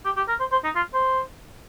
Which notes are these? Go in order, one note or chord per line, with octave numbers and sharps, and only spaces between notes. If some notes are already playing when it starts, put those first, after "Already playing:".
G4
G4
A#4
C5
C5
D#4
F4
C5